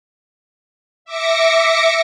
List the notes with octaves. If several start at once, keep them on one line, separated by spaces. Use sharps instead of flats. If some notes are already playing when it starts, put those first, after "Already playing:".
E5 D6 A#6 C#7